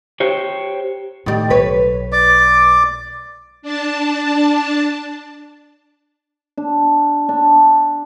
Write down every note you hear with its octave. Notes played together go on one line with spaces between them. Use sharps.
G4 C5 C#5
A2 D#3 G3
B1 B4 C#5
D5 D6
D4 A5
D4
D4